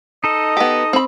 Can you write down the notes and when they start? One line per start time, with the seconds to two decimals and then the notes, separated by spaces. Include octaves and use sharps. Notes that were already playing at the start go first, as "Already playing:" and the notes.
0.24 D#4 A4 D#5
0.57 B3 G4
0.93 C4 B5